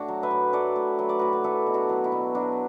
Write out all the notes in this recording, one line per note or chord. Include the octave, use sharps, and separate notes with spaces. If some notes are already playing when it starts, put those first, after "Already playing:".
Already playing: A2 D4 F#4
F#3
B4 E5
A2
F#3 A4 D5
A2
F#3 B4
D5
A2 F#4 B4
B4
F#3 E4 A4
B2
D4 F#4
F#3
E4
B2
F#3 D4 F#4